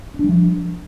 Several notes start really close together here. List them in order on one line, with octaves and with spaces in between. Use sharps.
C#4 D4 G3 F3